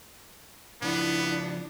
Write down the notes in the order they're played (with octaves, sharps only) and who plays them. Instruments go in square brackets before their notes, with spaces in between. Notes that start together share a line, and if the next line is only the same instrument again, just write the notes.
[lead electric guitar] C#3 F3 [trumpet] B3 [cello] D4 [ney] E4